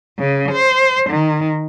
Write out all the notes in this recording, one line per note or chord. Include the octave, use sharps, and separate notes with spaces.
C#3
C5
D#3